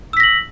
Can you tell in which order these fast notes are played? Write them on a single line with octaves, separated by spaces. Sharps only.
E6 B6 A#6 F#7